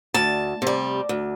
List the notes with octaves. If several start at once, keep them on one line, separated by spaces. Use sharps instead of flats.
D2 A5
C3 G3
D2